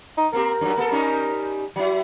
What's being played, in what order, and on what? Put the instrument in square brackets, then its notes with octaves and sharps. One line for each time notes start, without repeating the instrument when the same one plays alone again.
[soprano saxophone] D#4
[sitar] A#3 C4 G4 [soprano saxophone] A#4
[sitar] F#2 F#3
A#3 A4
G3 C#4 D#4
F#3 E4